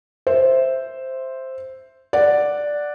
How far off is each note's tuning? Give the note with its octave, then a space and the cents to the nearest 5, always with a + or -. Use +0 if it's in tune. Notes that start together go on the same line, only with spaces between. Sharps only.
C5 +0 E5 +0
D5 +0 F#5 -5